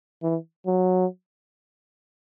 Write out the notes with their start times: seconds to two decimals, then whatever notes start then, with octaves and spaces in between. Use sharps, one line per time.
0.23 E3
0.67 F#3